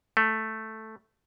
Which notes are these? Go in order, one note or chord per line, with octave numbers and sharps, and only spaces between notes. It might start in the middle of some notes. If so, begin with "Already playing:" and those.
A3